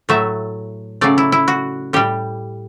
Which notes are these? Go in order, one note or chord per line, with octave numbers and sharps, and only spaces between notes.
A2 F#3 A3 E5
C#3 F#3 A3 D5
E4
E4
F#4
A2 G3 G4